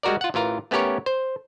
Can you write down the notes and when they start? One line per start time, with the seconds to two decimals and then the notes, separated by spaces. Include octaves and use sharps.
0.03 G3 G#3 F#4 A#4 D5
0.21 F4 F#5
0.34 A1 E3 F4 A#4
0.71 A3 B3 C#4 G4 A#4 C#5
1.06 C5